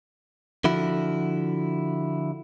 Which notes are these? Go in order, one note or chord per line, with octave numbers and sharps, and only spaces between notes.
D3 F3 E4 F#4